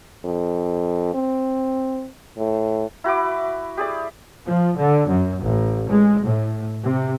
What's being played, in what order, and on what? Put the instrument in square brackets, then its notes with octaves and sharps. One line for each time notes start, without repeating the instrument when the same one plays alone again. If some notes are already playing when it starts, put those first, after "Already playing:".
[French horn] F2
C4
A2
[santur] E4 F#4 B5 D6
G4 G#4 D5
[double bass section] F3
D3
F#2
A1
G#3
A2
C3